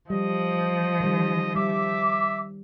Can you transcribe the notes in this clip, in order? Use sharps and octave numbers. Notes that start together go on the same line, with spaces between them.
F3 G3 D#5
D#3 G3
G3 E5 D6